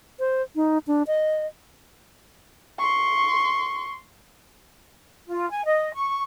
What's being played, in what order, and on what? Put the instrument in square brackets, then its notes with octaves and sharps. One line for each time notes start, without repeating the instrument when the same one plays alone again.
[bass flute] C5
D#4
D4
D#5
[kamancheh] C6 C#6
[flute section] F4
G#5
D#5
C#6